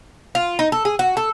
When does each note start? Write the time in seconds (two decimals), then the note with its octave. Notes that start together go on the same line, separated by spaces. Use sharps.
0.35 F4
0.59 D#4
0.72 A4
0.85 G#4
0.99 F#4
1.17 A4